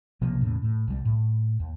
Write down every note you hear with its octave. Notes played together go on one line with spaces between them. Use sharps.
B1 C3 F3 A#3
E2 A2 C#3
A2
C2 G3
A2
D#2